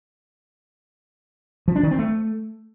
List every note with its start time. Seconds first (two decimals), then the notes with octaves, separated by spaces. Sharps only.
1.68 F3
1.75 D4
1.83 D#3
1.91 C4
1.99 A3